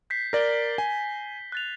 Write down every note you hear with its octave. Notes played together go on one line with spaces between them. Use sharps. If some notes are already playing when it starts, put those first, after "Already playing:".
G6 B6 C7
A#4 D5 A#6 G7
G#5
F#6 A6 F7